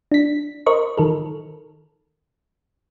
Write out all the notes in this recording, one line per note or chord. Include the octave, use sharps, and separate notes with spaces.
D4 B6
A#4 C5 D#5 C#6
D#3 A4 A#4